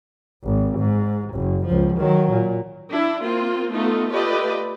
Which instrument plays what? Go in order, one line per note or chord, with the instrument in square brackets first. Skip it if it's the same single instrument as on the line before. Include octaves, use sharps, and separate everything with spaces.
[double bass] G#1
G#2
F#1
C#2 F3
D#3 F#3
A#2
[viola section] D4 E4
A#3 C4 F4
A3 B3 D#4 F4 A4
A3 F4 G4 B4 D5 D#5